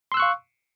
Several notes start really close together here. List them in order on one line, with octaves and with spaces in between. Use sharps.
C6 E6 F#6 C#6 F5